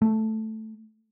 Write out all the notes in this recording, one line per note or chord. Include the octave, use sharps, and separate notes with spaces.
A3